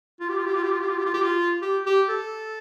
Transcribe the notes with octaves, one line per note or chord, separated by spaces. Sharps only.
F4
G4
F4
G4
F4
G4
F4
G4
F4
G4
F4
G4
F4
G4
G4
A4